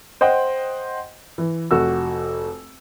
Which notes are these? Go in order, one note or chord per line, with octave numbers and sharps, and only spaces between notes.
C5 D#5 F#5 G5 C6
E3
F1 F#4 E6